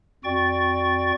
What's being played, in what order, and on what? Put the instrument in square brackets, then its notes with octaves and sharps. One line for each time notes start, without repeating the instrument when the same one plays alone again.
[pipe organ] F2 F#4 D5 G5 C#6 A6